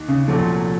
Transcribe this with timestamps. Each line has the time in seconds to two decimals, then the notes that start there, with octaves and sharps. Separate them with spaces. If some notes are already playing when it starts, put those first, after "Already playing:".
Already playing: D#2 D#3
0.09 C#3
0.28 C2 A#2 F3 F#3 A3